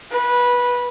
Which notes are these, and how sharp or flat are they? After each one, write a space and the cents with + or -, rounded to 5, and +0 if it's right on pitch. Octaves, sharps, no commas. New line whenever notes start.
B4 -15